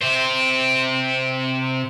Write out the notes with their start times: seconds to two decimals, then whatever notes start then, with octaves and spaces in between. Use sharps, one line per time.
0.01 C3 C5